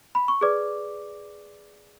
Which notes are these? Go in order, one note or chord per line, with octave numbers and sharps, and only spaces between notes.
B5
C#6
G#4 B4 D5 D6